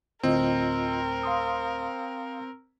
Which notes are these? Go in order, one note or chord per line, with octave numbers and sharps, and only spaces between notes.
D2 A2 C4 F4 A#4 D#5
F5 C6 D#6